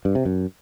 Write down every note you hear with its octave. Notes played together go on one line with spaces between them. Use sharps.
G2
C3
F#2